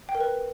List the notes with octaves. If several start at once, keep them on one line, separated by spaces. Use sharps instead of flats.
G5
A#4
B4